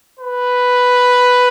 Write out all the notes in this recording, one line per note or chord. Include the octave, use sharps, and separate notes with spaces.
B4